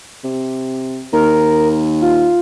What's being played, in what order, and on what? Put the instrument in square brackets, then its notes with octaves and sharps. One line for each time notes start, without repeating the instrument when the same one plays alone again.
[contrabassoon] C3
[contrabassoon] D#2 [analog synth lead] A#4
[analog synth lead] F4